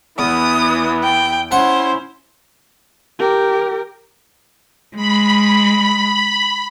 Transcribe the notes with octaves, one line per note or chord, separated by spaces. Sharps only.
E2 E3 B3 D#6
G5
C#4 E4 C5 F#5
G4 A#4
G#3 B5